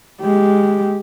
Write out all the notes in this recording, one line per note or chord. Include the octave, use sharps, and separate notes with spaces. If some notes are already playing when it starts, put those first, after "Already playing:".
G#3 G4